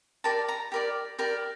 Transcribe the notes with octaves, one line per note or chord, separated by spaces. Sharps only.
G4 A#4 D5 A5
A#5
G4 A#4 D5
G4 A#4 D5